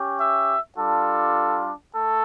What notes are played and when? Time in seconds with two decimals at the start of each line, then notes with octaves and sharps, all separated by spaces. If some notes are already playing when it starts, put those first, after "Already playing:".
Already playing: C#4 G4
0.17 E5
0.76 G3 D4 F4 A4
1.94 A3 A4